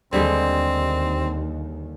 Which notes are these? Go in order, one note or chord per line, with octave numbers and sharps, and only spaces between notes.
D#2 D3 G3 G#3 C4